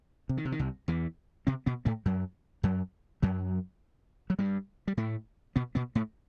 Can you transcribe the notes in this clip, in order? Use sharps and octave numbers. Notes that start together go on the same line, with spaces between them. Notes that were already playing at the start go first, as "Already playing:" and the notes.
C3
D#3
C3
D#3
C2 C3
E2 E3
C3 C4
B2 B3
A2 A3
F#2 F#3
F#2 F#3
F#2 F#3
F#3
G2 G3
G3
A2 A3
B2 B3
B2 B3
A2 A3